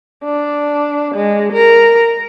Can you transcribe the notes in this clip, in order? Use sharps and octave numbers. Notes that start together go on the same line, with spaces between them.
D4
G#3
A#4